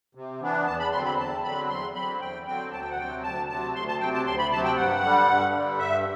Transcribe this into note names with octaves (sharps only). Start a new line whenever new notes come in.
C3
E3 B3 D4
E2 A5
B5
D3 F#3 C4 C6
B5
E2 A5
D3 F#3 C4 B5
E2 C6
D3 F#3 C4 B5
E2 G5
D3 F#3 C4 G5
D2 A5
G5
F#5
C3 F#3 G5
D2 A5
C3 F#3 A5
D2 C6
A5
C3 F#3 G5
A5
D2 C6
B5
C3 F#3 A5
G5
G2 F#5
D3 G3
G2
D3 G3
G2 E5